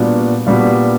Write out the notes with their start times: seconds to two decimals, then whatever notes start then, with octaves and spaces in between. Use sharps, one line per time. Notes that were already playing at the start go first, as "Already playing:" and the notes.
Already playing: A#2 G3 B3 D4 F#4
0.46 A#2 G3 B3 D4 F#4